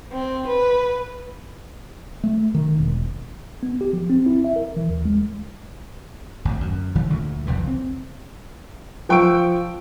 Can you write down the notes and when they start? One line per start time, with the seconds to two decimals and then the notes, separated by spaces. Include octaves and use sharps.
0.12 C4
0.47 B4
2.24 A3
2.54 D#3
2.78 E1
3.63 B3
3.81 G4
3.93 F3
4.10 C4
4.26 E4
4.44 E5
4.56 A#4
4.76 E3
4.90 D#2
5.05 G#3
6.45 G#1 D2
6.60 F#2
6.95 F1 D#3 E3 G3
7.10 D2 A#2 D3
7.47 F#1 C2 F2 E3
7.67 C4
9.09 F3 G5 C#6 E6 D7